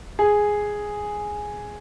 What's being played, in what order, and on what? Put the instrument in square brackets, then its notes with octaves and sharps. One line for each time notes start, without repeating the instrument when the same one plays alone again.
[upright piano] G#4